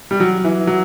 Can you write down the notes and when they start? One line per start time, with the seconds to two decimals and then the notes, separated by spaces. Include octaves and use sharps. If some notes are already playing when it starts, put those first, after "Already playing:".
0.11 G3
0.20 F#3
0.44 E3
0.67 F#3